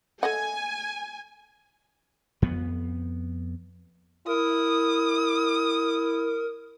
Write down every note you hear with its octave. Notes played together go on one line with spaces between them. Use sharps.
A4 D#5 F#5 G#5
F2 B3
E4 A#4 D#6